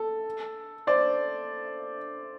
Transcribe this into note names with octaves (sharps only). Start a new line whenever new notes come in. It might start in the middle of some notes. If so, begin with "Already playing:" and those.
Already playing: A4
C5 D5